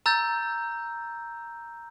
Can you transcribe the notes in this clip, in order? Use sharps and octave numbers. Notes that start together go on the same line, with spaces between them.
A#5 E6 G6 A6